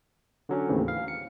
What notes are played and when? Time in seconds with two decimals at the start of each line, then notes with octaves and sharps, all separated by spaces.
0.49 D3 F#3 C#4
0.69 D#2 A2 C#3 E3 C4
0.88 F5
1.08 C#7